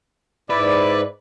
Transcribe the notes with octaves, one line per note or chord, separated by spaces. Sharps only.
G#2 E4 B4 D5